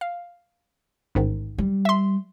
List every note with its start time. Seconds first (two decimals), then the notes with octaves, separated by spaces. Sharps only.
0.01 F5
1.15 A1 G#2 D#3
1.58 G3
1.85 E5 C6